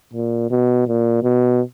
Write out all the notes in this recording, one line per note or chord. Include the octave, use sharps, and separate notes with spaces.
A#2
B2
A#2
B2